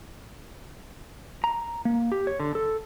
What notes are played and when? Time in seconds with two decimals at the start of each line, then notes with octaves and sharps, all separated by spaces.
1.44 A#5
1.85 A#3
2.12 G4
2.27 C#5
2.40 D3
2.55 A4